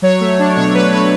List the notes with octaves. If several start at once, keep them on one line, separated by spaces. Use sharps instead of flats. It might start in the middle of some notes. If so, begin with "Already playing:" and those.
F#3 C#5
A3
D4
B2 C#5
F#3 B4
A3 B4